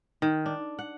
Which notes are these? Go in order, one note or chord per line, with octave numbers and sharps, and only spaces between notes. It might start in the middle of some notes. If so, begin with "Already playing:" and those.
D#3
D4
F#5